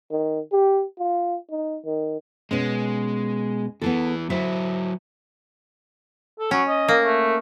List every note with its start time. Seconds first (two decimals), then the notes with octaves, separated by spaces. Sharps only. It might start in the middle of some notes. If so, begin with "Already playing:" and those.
0.11 D#3
0.52 G4
0.99 F4
1.50 D#4
1.85 D#3
2.51 B2 G#3 B3 C#4
3.82 E2 E3 B3 G#4 A4
4.30 F#3 E4 A4 C5 E5
6.39 A4
6.51 F#3 C#4
6.68 D#5
6.88 A#3
7.02 A3